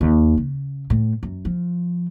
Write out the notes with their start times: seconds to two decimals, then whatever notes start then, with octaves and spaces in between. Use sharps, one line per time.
0.01 D#2
0.37 C#3
0.90 A2
1.23 F#2
1.45 F3